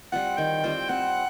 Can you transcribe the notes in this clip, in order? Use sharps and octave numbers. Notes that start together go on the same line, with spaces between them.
G3 C4 F4 F#5
D#3 G5
G3 C4 F4
C4 F#5